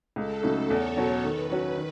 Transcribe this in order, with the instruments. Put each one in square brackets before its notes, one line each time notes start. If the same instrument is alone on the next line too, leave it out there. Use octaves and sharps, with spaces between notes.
[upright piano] C#2 [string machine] A4
[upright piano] C#3 F#3 A3 D#4
[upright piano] E2 [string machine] C#5
[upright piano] B2 F#3 C#4
[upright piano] D#3 [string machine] B4
[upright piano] F#3 C#4 F#4
D#3